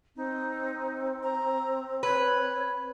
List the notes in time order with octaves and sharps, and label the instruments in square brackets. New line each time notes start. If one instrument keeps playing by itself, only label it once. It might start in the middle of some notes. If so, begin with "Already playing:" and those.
[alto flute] C4 [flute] D#4
[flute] A#5
[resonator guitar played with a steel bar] B4 [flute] C#5